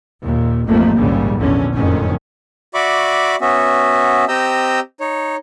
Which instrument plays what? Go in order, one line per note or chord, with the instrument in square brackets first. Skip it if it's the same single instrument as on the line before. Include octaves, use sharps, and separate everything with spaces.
[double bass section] D#2 A#2
A1 F2 G#2 F3 A3 A#3
A#1 D#2 G#2 C#3 G3
A#1 E2 D3 C#4
F#1 F2 A2 D3 D#3 C#4
[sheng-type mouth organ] F#4 D5 E5 B5 C#6 D6
B3 C#4 F#4 E5
C4 G4 D#5 A#5 E6 G6
D#4 C#5